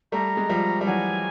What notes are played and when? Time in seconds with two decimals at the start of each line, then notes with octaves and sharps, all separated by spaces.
0.12 G3 A3 A#5
0.37 G#3
0.49 F3 G3
0.81 G3
0.86 E3 F#3 G#5